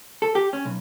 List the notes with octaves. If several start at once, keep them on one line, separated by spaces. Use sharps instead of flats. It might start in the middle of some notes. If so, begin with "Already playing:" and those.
A4
G4
C#4
B1